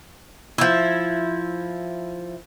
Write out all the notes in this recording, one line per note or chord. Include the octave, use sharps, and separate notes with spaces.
F3 E4